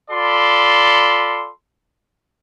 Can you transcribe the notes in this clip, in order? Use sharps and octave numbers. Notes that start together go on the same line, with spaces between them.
F4 A4 D5 B5 C6